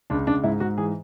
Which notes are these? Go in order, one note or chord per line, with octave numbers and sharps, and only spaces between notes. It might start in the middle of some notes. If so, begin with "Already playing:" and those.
C#2 D4
C#2 D4
G#2 E4
G#2 F#4
E3 G#4